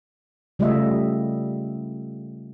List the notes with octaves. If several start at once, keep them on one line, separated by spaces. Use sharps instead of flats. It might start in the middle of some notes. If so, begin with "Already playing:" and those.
C#3 G3 A3 F4 D#5 E5